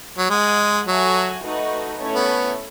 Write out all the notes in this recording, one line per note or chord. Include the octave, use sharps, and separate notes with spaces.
F#3
G#3 G#4 D#5 F#5
F#3 F#4 A4 E5 G#5
A3 D#4 F#4 B4
A3 C#4 E4 A4 C#5
B3